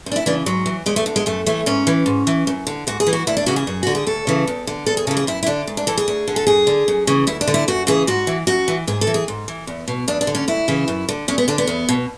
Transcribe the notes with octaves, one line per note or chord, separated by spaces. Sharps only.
F#2
D4
E4
C#3 E3 D4
G#2 F#3
E3
E2 G#3
A3
D3
G#3
F#2 A3
E3 A3
G#2 C#4
E3
G#2
E3
F#2
D3
G#2 F#4
G#4
E3
F#4
D2 E4
D4
C#3 E3 F#4
G#4
F#2
D3 F#4
G#4
D2 A4
C#3 E3
E2
D3
E2 A4
G#4
C#3 E3 A4
G#4
F#2 E4
E4
D3 D4
G#2
D4
E3 A4
G#4
D2
D3
A4
F#2 G#4
D3
F#2
C#3 E3
D2 E4
D4
D3
E4
F#2 F#4
C#3 E3 G#4
G#2 F#4
E3
F#2 F#4
E3
G#2 G#4
A4
E3
G#4
G#2
E3
E2
B2
E2 D4
D4
D3
C#4
D2 E4
C#3 E3
F#2
D3
E2 C#4
B3
D3 D4
B3
E2
B2